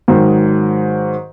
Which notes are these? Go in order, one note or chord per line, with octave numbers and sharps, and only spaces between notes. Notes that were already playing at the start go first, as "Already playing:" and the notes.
G#2 D#3 F#3